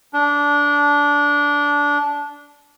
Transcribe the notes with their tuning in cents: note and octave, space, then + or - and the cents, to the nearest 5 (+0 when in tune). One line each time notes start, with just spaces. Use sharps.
D4 -15